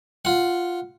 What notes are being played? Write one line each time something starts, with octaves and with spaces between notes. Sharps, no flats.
F4 F#5